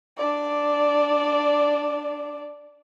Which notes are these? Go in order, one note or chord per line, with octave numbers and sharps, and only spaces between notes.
D4 D5